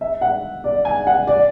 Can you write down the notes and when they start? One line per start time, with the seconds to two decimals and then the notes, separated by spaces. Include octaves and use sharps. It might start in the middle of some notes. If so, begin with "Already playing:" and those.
0.01 E5
0.21 F#5
0.64 D5
0.85 G#5
1.07 F#5
1.27 D5